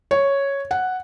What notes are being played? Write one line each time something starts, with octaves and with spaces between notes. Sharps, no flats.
C#5
F#5